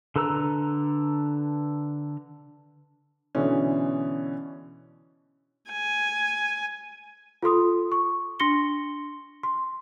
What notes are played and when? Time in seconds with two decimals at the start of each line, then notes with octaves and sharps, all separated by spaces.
0.16 D3 A4 B4 A#5 E6
3.35 B2 D3 E3 C#4
5.71 G#5
7.42 F4 A4 C6 D#6
7.92 C#6
8.40 D4 C6 A#6 C#7 G7
9.43 C6